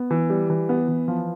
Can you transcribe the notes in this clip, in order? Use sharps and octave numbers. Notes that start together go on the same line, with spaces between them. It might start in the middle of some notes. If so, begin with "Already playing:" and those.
Already playing: B3
E3
G3
E3
B3
E3
F3